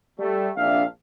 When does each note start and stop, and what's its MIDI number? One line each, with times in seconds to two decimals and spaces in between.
0.19 0.48 55
0.19 0.48 57
0.57 0.84 34
0.57 0.84 48
0.57 0.84 62
0.57 0.84 76
0.57 0.84 77